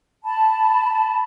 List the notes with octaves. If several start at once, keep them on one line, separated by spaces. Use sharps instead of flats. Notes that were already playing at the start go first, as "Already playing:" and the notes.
A5 B5